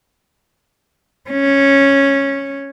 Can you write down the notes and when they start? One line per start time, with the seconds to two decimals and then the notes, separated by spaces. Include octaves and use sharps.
1.30 C#4